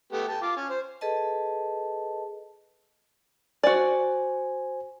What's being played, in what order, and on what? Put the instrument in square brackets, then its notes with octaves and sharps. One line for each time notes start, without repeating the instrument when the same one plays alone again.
[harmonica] A3 B3 G4
G5 A5
F4 D6
C#4
C5
[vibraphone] G#4 A4 B4 D#5 A5
[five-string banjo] F#4 D5 [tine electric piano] C5 G#5